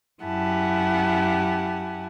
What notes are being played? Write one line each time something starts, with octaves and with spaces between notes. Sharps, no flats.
F#2 E4 G4 F#5 G#5 A5